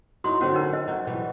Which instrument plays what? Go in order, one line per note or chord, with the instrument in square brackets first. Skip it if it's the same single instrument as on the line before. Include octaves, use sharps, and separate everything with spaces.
[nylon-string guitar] F#3 D#4 E4 [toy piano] F#4 C6
[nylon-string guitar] D3 F#3 C4 [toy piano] C#4 F#4
[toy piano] D#4 A#4
D#5
[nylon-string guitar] F#3 G5
B2 E3 G3